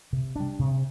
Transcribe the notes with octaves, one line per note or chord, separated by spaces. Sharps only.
C3
G3 D4
C3